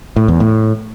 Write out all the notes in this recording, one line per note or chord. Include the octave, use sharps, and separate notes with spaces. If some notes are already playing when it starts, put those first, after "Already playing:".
A2
E2
A2